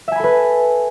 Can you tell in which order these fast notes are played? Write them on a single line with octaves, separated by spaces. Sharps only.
E5 G#5 B5 A4 B4